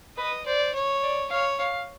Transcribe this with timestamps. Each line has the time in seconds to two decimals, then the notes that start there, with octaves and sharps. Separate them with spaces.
0.17 B4 D#5
0.46 C5 D5
0.74 C#5
1.03 D5
1.30 C#5 F5
1.59 F5